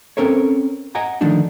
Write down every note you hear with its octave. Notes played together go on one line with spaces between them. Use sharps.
C4 C#4 A4 A#4 C5 C#5
D#5 F#5 G#5 A#5
D3 D#3 F3 A3 D4 D#4